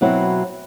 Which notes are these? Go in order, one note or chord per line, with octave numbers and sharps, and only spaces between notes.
B2 F#3 C4 E4